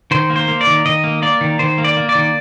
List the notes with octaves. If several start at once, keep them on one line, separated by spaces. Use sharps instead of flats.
D#3 C5
A#3
C5
A#3
D5
D#3
D#3 D#5
A#3
A#3 D5
D#3
D#3 C5
A#3
D5
A#3
D5
D#3